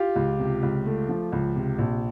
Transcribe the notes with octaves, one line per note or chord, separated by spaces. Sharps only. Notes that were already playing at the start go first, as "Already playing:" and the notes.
Already playing: F4 G4
C#2
C3
C#2
A3
F3
C#2
C3
A#1